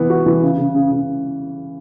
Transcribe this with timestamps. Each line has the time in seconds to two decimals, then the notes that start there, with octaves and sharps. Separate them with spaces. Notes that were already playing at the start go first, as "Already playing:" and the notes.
Already playing: E3 B3
0.10 F#4
0.26 E3
0.42 C#3
0.58 C#3
0.75 C#3
0.91 C#3